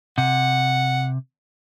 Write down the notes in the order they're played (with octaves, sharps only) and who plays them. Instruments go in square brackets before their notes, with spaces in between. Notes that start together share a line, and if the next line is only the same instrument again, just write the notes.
[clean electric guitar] C3 [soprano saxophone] F#5